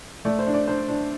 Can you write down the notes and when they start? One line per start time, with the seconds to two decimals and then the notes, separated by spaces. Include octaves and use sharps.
0.25 A3 D5
0.39 C5
0.47 D4
0.54 D5
0.68 D4 C5
0.88 D4